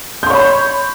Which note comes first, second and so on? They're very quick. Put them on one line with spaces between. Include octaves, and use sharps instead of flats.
G6 C6 C#5 B5